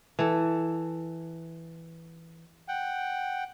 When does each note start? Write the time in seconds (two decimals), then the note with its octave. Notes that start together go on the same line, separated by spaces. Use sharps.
0.19 E3 A4
2.68 F#5 G5